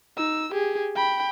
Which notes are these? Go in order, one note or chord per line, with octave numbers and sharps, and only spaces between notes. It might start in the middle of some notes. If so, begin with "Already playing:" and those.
D#4 E6
G4 G#4
G5 B5